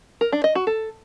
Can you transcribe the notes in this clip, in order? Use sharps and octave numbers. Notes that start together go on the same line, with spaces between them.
A#4
D4
D#5
F#4
A4